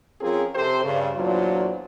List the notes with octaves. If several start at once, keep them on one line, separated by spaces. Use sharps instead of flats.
F3 C4 C#4 F4 G#4 A#4
C3 C4 G4 A4 C5
G2 C#3
E2 A#2 F#3 D4 F4 C5